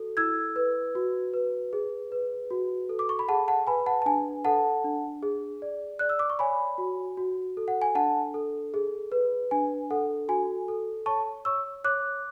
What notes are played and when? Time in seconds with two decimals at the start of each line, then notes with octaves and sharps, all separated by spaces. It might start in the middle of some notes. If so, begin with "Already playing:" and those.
Already playing: F#4 A4
0.17 E4 E6 G#6
0.56 B4
0.95 F#4
1.34 B4
1.73 G#4
2.12 B4
2.51 F#4
2.89 A4
2.99 D6
3.09 C#6
3.19 B5
3.28 G#4 F#5 A5
3.48 F#5 A5
3.67 B4 G#5 B5
3.86 F#5 A5
4.02 A5
4.06 D4 G#5
4.45 A4 F#5 A5
4.84 D4
5.23 G#4
5.62 D5
5.99 D5 F#6
6.09 E6
6.19 D6
6.30 C#6
6.39 C#5 G#5 B5
6.78 F#4
7.17 F#4
7.57 A4
7.68 F#5
7.82 G#5
7.95 D4 F#5 A5
8.34 A4
8.74 G#4
9.12 B4
9.51 D4 G#5
9.91 A4 F#5
10.29 F#4 G#5
10.68 A4
11.06 C#5 A5 C#6
11.45 C#5 C#6 E6
11.84 C#5 D6 F#6